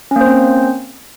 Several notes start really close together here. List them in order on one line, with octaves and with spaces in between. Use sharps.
C#4 A#3 C5 C4